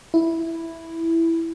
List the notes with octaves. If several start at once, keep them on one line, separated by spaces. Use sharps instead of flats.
E4